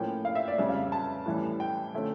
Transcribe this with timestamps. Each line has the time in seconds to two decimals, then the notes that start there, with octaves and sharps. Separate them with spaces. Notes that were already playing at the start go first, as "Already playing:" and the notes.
Already playing: A2 F3 A#3 C#4 G5
0.25 F5
0.35 E5
0.48 D5
0.58 F2 C#3 G3 C#4 E5
0.69 F5
0.92 A5
1.26 A2 E3 G3 C#4
1.60 G5
1.94 D3 F3 A3 C#4